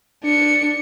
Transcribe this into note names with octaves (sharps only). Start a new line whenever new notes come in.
D4 C#7